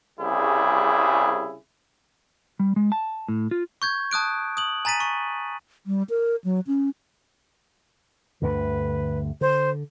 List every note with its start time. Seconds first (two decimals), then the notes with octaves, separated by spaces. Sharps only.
0.20 C2 C#3 G3 E4 G#4
2.60 G3
2.76 G#3
2.92 A5
3.28 A2
3.51 F4
3.82 C#6 G6 G#6
4.11 A5 D#6 F#6 D7
4.57 D#6 F#7
4.85 G#5 A#5 A6 B6 D#7
5.00 C#6
5.86 G3
6.10 A#4
6.44 F#3
6.67 C#4
8.42 D2 G2 D3 B4
9.41 D3 C5